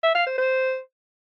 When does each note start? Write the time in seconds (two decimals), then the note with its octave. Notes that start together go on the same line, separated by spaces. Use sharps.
0.03 E5
0.15 F5
0.27 C5
0.38 C5